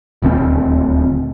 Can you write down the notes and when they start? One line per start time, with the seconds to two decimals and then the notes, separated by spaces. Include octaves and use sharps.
0.22 D#1 D2 B3 C4